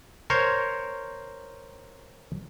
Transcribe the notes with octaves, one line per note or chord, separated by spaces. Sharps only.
A#4 C5 C#5